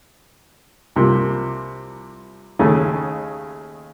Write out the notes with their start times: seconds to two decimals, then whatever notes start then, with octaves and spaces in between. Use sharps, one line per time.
0.96 C2 C3 F3 A#3
2.59 D#2 C#3 A3 D#4